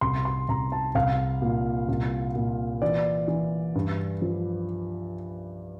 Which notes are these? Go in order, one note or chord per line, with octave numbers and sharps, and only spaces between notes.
C2 C6
C6
C2 A#5
A5
C2 F5
A#2
C2
A#2
E3 D5
E3
G2
F3